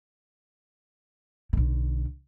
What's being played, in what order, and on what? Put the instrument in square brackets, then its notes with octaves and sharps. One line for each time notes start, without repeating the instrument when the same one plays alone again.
[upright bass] B1 D3